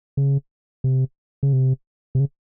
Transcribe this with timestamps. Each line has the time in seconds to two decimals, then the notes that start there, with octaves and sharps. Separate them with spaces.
0.17 C#3
0.84 C3
1.43 C#3
1.53 C3
2.15 C3
2.20 C#3